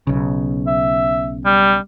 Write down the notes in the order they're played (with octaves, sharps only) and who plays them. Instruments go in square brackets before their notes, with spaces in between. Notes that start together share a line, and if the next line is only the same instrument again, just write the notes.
[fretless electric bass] B1 C#3
[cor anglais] E5
G3